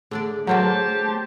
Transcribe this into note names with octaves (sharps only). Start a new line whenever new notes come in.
D3 A3 D4 G#4 D5
D3 F#3 A#3 G4 B4 C5 A5